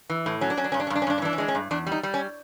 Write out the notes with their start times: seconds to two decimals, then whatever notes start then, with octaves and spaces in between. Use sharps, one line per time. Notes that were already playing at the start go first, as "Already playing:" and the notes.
0.10 E3
0.26 A2
0.41 F#3 C#4
0.50 D4
0.57 F#3 C#4
0.64 D4
0.72 G2 C#4
0.80 D4
0.87 C#4
0.90 G2
0.95 D4
1.02 C#4
1.07 G2 D4
1.18 C#4
1.22 E3 D4
1.33 C#4
1.38 G#3 D4
1.48 C#4
1.55 G2
1.71 E2 D4
1.87 G3
1.92 D#4
2.03 G3
2.14 C#4